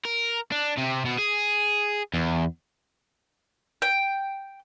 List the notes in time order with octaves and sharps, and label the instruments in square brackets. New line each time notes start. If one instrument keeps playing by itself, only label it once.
[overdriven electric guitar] A#4
D4
C3
B2
G#4
E2
[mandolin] G5